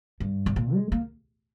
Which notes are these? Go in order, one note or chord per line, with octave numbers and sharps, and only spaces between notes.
G2
G#2
A#2
G#3
A#3